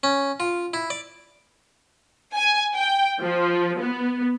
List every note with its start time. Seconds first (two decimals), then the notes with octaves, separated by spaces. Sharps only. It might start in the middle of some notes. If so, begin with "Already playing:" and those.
0.03 C#4
0.40 F4
0.74 E4
0.90 D5
2.35 G#5
2.74 G5
3.20 F3
3.78 B3